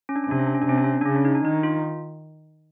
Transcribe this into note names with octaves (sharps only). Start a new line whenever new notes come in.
C#4
D4
C#4
C3 D4
C#4
D4
C#4
D4
C3 C#4
D4
C#4
D4
C#3 C#4
D4
D#4
D4
D#3 D#4
F4